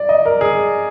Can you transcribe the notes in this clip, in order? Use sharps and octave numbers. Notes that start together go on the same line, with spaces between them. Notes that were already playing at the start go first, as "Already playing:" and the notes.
Already playing: D5
D#5
A#4
G#4